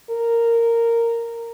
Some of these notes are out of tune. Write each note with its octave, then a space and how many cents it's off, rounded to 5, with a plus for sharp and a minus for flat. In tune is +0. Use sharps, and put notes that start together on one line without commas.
A#4 -10